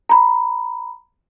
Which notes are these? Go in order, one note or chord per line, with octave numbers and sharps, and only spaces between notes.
A#5 B5